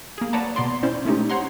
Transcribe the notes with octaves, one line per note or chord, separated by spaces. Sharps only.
A#3 G#4
B4 C#5 D5 F#5 A5 A#5
B2 B3 D5 C6
C4 C#4 E4 C5 D5
G#3 A3 C#4 D#4 G4
C5 C#5 F#5 A#5 C6